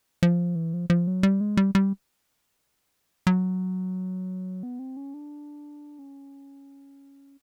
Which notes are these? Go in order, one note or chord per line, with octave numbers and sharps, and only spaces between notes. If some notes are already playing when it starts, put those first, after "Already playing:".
F3
E3
F3
F3
F#3
G3
G#3
G3
G3
F#3
B3
C4
C#4
D4
C#4